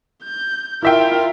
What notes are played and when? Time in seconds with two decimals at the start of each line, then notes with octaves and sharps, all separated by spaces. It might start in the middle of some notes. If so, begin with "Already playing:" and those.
0.24 G6
0.83 E4 F4 A#4 E5 G5